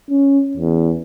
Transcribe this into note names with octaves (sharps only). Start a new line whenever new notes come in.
C#4
E2